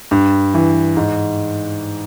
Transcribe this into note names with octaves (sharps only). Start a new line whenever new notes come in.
G2
E3
G#2